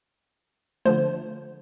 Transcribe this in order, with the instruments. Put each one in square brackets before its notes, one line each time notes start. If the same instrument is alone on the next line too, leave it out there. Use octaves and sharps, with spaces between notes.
[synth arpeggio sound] D3 F3 A3 C5